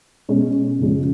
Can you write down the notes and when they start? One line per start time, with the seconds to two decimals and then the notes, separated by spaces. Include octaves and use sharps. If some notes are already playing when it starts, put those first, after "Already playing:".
0.29 B2 G#3 C#4
0.79 F#2 C#3 F3 G#3 C#4